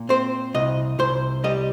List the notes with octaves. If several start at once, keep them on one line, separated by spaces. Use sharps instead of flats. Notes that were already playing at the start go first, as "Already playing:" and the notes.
Already playing: A#2
C4 C5
C2 D#5
C2 C5
G3 D#5